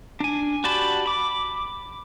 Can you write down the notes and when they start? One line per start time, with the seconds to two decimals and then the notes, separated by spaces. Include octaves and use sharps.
0.20 D4 G#5
0.64 F#4 G4 D5 A5 B5
1.06 B5 D6